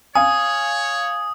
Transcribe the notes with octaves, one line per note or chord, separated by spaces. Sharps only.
C#5 F5 G#5 D#6